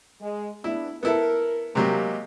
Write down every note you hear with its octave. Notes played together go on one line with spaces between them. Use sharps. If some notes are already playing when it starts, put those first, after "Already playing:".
G#3
B3 D4 E4
B3 E4 A4 A#4
C3 F#3 G#3 A#3 G4